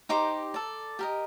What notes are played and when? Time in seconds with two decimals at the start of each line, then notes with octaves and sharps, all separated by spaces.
0.09 D#4 G4 C5 A#5 D6
0.54 A4 D5
0.99 G4 A#4 D#5